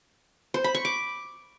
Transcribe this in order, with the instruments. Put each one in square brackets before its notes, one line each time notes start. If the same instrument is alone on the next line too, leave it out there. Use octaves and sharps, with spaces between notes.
[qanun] C5
B5
C#6
D6